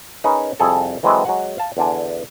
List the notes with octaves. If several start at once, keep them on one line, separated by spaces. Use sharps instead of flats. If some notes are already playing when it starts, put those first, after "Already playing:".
C#4 D#4 G#4 A#4 B4
C2 F2 G#4 A4
E3 F#3 G#3 C4 A4 D#5
F#3 G#3 F#4 F#5
F5 A5
E2 D3 D4 G#5